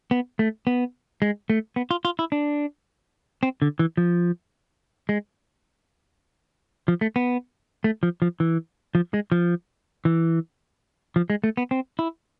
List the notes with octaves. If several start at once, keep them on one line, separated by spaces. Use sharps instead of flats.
B3
A3
B3
G#3
A3
B3
F4
F4
E4
D4
C4
D3
E3
F3
G#3
F3
A3
B3
A3
F3
F3
E3
F3
G#3
F3
E3
F3
G#3
A3
B3
C4
E4